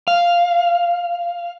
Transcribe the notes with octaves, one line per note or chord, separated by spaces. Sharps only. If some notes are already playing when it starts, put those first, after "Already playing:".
F5